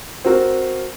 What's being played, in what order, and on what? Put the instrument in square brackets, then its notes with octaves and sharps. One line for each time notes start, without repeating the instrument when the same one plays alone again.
[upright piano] C4 F#4 A#4